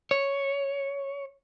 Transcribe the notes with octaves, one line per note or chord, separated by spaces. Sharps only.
C#5